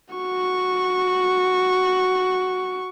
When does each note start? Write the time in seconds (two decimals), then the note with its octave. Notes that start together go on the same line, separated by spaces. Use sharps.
0.14 F#4 C#6